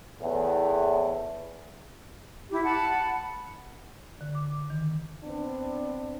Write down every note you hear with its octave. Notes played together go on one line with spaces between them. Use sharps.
E2 A2
E4 G4
F#5 A5 B5
D3
D6
D#3
B3 C4 D4